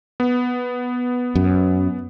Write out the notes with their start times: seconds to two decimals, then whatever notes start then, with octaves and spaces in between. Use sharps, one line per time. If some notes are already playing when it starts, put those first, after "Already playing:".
0.20 B3
1.35 F#2